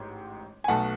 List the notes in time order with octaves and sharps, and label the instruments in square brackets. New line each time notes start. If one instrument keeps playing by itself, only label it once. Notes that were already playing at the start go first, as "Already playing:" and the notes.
Already playing: [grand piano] A1 G#2
G#5
B1 B2 A3 F#5 A5